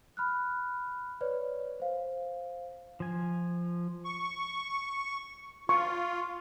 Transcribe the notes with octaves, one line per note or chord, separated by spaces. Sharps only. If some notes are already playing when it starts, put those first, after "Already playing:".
B5 F6 F#6
B4 C#5 D5
C5 F5
F3 G#5
C#6
F4 C#6